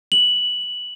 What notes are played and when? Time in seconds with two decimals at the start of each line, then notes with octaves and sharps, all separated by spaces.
0.12 F#7